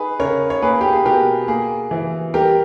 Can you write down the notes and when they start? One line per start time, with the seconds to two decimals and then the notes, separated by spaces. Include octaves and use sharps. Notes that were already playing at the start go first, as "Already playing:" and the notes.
Already playing: D#4 G#4 B4
0.19 C#3 A#4 C#5
0.50 C#5
0.62 A#3 G#4 B4
0.81 G4
0.93 G#4
1.05 B2 G4 A#4
1.48 A#3 G#4
1.91 E3
2.34 G3 G4 A#4